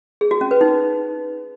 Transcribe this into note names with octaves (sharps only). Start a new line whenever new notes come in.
G#4
F#4
C#4
B4
D#4